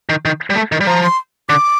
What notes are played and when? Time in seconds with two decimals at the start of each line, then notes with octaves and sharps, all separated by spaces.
0.09 D#3
0.25 D#3
0.50 G3
0.56 A3
0.72 D#3
0.81 G3
0.87 F3 A#5
1.03 C6
1.49 D3 D6